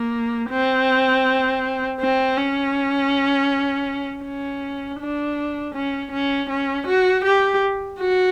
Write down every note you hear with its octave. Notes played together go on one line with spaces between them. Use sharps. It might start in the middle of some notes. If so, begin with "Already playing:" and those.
Already playing: A#3
C4
C4
C#4
C#4
D4
C#4
C#4
C#4
F#4
G4
F#4